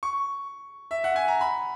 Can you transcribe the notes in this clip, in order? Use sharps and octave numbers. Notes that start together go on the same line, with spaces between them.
C#6
E5
F#5
G#5
A#5
B5